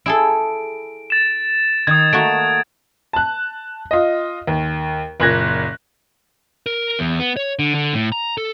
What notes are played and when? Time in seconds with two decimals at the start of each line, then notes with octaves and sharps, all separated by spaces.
0.06 E4 G#4 A4 D7
1.10 A6 E7
1.87 D#3 D#6 G#6
2.13 A3 A#3 F#4 D7
3.13 A5 F#6
3.91 F4 D#5
4.47 D#2
5.20 F#1 A#2 F#6 G#6 A#6
6.66 A#4
6.99 E2
7.20 B3
7.37 C#5
7.59 D3
7.75 D3
7.94 A2
8.12 A#5
8.38 A4